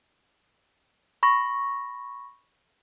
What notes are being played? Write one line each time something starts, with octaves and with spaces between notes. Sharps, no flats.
B5 C#6 A#6